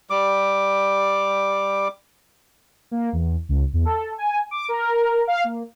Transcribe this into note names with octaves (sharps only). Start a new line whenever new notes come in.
G3 D6
A#3
E2
C#2
E2
A4
G#5
D6
A#4
F5
A#3